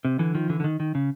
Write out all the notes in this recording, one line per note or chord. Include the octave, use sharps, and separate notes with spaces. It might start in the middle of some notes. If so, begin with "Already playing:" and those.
C3
D3 E3
D#3 F3
D3 E3
D3
D#3
D#3
C#3